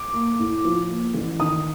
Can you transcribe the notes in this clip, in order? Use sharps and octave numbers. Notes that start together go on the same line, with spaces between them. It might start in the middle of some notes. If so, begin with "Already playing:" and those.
Already playing: D6
A#3
A2
F3
A#3
A1
D#3 D#6